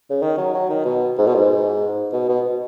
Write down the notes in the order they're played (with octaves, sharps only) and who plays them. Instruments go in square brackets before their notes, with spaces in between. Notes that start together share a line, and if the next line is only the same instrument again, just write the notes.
[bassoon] C#3
D#3
F#3
F#3
D#3
B2
G#2
B2
G#2
B2
B2